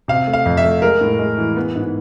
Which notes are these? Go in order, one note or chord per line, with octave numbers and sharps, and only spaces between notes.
C3 F5
A3
F5
F2
E5
A3
G#3 A#4
A2
G#3
E3
B3
G#2